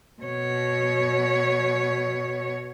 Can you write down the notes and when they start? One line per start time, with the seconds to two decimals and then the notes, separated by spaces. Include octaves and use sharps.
0.22 B2 C#5